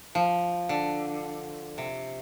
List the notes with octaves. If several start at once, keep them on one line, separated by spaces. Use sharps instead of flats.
F3
D3
C3